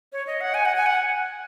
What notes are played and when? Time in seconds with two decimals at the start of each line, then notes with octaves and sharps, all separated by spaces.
0.13 C#5
0.27 D#5
0.41 F#5
0.54 G#5
0.65 F#5
0.76 G#5
0.86 F#5